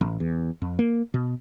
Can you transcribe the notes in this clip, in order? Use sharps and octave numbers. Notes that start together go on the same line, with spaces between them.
A1
E2
F2
A#3
B2